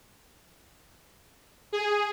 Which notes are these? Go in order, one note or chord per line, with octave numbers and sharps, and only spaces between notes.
G#4